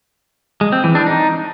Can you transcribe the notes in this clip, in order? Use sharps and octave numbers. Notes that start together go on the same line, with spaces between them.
G#3
C4
E3
D4
D#4